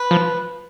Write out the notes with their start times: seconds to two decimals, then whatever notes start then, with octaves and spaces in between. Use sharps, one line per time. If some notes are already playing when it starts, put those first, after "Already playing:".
Already playing: B4
0.11 F3